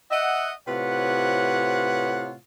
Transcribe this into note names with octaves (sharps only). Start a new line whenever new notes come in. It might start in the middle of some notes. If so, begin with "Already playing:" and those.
D#5 E5 F#5
A2 C3 F4 B4 C#5 F#5